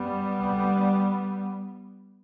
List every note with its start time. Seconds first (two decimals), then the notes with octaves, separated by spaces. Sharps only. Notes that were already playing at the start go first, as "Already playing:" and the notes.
Already playing: F#2 G3 B3
0.37 D2 C3